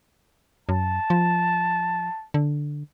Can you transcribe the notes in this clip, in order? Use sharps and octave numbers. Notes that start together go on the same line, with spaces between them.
F#2 A5
F3
D3